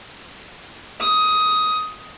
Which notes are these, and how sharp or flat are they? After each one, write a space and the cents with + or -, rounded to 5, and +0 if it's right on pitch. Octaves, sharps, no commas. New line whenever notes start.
D#6 +15